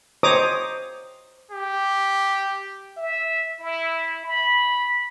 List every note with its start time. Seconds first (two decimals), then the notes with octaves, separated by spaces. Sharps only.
0.23 C5 C#5 D#5 A#5 D6 D#6
1.51 G4
2.97 E5
3.60 E4
4.25 B5